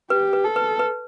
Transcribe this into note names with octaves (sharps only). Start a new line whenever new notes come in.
G4 B4
B4
A4
B4
B4